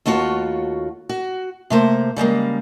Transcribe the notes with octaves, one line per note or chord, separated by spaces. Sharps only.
D#2 A3 F4 F#4 C#5
F#4
C3 A3 A#3 C5
C#3 G3 G#3 A#3